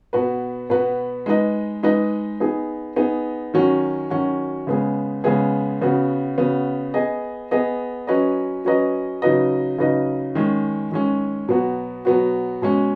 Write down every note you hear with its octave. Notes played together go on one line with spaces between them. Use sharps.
B2 B3 F#4 B4
B2 B3 F#4 B4
G#3 D#4 B4 D#5
G#3 D#4 B4 D#5
B3 D#4 G#4
B3 D#4 G#4
D#3 F#3 C#4 F#4
D#3 F#3 C#4 F#4
C#3 G#3 B3 G#4
C#3 G#3 B3 G#4
C#3 B3 F#4
C#3 B3 F#4
B3 G#4 D#5
B3 G#4 D#5
F#3 C#4 B4 D#5
F#3 C#4 B4 D#5
C#3 F#3 D#4 B4 D#5
C#3 F#3 D#4 B4 D#5
D#3 G#3 C#4
D#3 G#3 C#4
B2 F#3 B3 F#4
B2 F#3 B3 F#4
B2 G#3 C#4